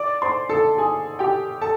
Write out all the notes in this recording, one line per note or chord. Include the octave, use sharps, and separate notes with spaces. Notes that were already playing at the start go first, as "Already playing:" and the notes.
Already playing: D5 D6
C5 C6
A4 A5
G#4 G#5
G4 G5
A4 A5